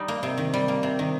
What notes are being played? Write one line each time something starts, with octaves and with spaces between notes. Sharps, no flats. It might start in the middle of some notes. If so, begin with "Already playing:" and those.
Already playing: G3 D#4
A#3
C3
D#3
G3
A#3
C3
D#3